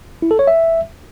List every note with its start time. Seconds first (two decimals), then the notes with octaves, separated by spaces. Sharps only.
0.22 E4
0.31 A4
0.39 C#5
0.47 E5